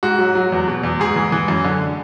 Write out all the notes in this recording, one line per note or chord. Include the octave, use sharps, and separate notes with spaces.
G#2 F#4
F#3
F#3
E2
B2
E2
G#2 G#4
E3
E3
F#2
D3